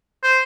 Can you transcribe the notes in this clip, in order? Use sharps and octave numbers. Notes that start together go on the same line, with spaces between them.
C5